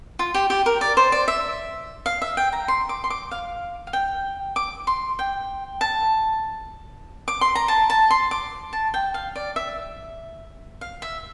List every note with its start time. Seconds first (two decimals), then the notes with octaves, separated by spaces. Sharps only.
0.19 F4
0.34 G4
0.50 G4
0.66 A#4
0.81 D5
0.97 C5
1.12 D5
1.28 E5
2.06 F5
2.22 E5
2.37 G5
2.53 A#5
2.68 C6
2.89 D6
3.04 C6
3.10 D6
3.31 F5
3.87 F5
3.93 G5
4.56 D6
4.87 C6
5.19 G5
5.81 A5
7.28 D6
7.41 C6
7.55 A#5
7.68 A5
7.90 A5
8.11 C6
8.31 D6
8.73 A5
8.94 G5
9.14 F5
9.36 D5
9.56 E5
10.81 F5
11.02 E5